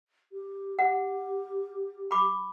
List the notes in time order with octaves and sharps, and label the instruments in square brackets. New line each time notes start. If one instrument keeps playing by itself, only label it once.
[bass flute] G4
[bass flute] G4 [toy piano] F#5
[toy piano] B5 D6